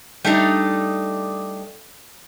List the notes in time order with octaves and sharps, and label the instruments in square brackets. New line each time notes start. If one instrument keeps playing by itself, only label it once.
[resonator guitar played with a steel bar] G3 A3 D4 D#4